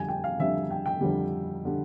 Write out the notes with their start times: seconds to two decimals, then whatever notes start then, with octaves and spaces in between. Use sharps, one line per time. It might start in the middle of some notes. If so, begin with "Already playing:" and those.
Already playing: F2 D3 G3 G#5
0.08 G5
0.24 F5
0.39 F2 D3 G3 E5
0.71 G5
0.86 G5
1.01 F2 D3 G3
1.65 D3 G3